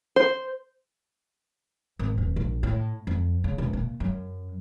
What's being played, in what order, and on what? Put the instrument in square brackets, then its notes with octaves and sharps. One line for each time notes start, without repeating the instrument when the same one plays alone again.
[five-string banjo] C5
[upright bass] G#1
D#1
A#1
A2
F2
C#3
E1
A#2
F#2